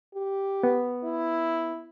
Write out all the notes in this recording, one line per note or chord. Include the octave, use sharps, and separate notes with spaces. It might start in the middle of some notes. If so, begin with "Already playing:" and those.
G4
B3
E4